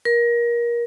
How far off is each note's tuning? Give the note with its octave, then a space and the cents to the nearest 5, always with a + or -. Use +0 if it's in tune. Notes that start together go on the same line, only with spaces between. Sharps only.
A#4 +25